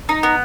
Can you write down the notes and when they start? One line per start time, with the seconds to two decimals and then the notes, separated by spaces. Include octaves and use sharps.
0.09 D#4
0.23 B3